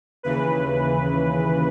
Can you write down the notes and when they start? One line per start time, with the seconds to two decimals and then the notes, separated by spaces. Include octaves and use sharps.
0.23 D#2 C#3 E3 B4